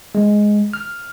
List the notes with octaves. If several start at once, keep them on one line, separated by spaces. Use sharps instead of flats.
G#3
F6